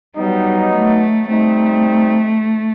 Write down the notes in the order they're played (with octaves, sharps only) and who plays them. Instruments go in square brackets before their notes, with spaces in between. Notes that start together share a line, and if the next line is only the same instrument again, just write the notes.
[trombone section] F#3 B3 D#4 [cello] G3
[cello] A3
[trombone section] G3 C4 D#4 [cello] A3